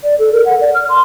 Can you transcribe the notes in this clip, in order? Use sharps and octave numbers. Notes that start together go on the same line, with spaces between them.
D5
A4
A#4
F#5
D5
F6
C6